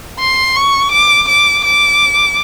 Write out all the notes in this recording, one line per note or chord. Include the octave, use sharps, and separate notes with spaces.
C6
C#6
D6
D6
D6